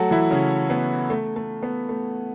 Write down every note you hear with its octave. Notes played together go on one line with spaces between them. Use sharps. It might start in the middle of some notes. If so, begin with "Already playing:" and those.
Already playing: F#3 A3 F#4 A4
E3 E4
C#3 C#4
B3
A3
A3
B3
A3